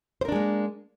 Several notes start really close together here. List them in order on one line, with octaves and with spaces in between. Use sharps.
C5 A#4 D4 G#3 A#3